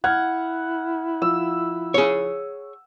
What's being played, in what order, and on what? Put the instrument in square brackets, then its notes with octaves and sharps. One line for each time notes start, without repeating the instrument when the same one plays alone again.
[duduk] E4 [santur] F#5 [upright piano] F6 G#6
[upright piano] F3 [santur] E6
[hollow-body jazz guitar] G#4 C#5